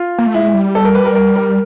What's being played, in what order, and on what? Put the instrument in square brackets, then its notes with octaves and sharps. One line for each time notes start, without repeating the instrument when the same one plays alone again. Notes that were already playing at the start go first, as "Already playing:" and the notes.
Already playing: [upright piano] F4
[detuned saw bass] A#3
A3
[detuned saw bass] G#3 [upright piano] E4
[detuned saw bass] G3
[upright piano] A4
A#4
B4
A#4
A#4
A#4